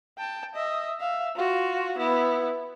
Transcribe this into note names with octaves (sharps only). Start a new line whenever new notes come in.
G5 A5
D#5 E5
E5 F5
F4 F#4
B3 E4